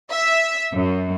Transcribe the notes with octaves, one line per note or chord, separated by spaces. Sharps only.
E5
F#2